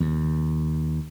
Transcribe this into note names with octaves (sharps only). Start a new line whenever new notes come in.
D#2